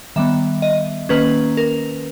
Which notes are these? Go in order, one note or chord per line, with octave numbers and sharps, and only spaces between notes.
D#3 G3 B3 E5
D#5
D#3 A#3 C#4 B4
A#4